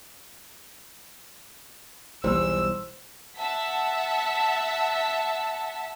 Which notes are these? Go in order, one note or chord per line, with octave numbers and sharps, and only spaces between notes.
B1 E2 G3 C5 E6
E5 F#5 A5 B6